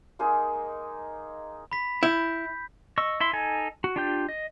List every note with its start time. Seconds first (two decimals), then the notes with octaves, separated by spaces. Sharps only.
0.19 G#3 A#3 D#4 G#4
1.72 B5 B6
2.03 E4 G6
2.98 D#5 C#6 E6
3.20 E4 E5 C6
3.33 D#4 A4 G#5
3.84 F#4
3.96 D4 F4 G4 G5 G6
4.29 D#5